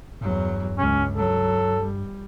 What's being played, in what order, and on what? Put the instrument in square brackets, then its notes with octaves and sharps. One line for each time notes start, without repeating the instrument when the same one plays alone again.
[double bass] E2 F#3 [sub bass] G2
[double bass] C#2 [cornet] C#4
[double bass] F#3 [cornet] A4
[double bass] G3